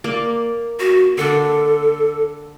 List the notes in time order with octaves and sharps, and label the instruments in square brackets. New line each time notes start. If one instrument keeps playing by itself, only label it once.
[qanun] A#3 D5
[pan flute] F#4
[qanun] D3 D4 [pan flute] A4